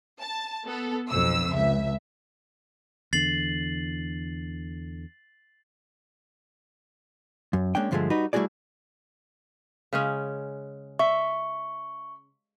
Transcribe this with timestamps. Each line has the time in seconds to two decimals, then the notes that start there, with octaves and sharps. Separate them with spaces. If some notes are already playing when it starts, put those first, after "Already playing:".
0.21 A5
0.66 B3 A4
1.11 B1 F2 E6
1.51 C#2 E5
3.13 E2 D3 A6 C7 F#7
7.53 F#2
7.75 G#3 A#3 C#4 D4 G5
7.91 G2 D3 F3 F#3 G#3 A3
8.10 G3 D#4 F#4 B4
8.33 G3 A3 E4 F#4 G#4 D5
9.93 C#3 G#3 C#4
10.99 E5 C#6